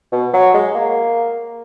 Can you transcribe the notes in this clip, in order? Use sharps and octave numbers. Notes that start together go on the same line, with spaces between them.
B2
F#3
G#3
A#3